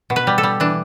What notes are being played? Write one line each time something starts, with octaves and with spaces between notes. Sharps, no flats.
B2
B4
G3
A4
G3
E3 D4